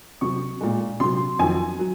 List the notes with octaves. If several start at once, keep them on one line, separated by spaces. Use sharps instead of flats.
C3 F#3 C#6
A#2 G#3
C3 F#3 C6
F2 D#3 F#3 G#5
F#3